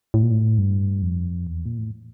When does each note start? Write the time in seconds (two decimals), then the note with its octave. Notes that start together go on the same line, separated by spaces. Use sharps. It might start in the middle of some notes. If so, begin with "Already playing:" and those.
0.14 A2
0.23 A#2
0.31 A2
0.58 G2
1.02 F2
1.47 E2
1.66 A#2
1.78 A2